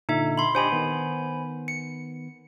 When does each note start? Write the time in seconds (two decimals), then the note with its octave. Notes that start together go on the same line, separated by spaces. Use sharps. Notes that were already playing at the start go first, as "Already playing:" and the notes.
0.09 A#2 D3 D#4 E5
0.38 B5 C6
0.55 D4 G4 C5 D#5 G#5 B5
0.72 D#3 B3
1.68 C#7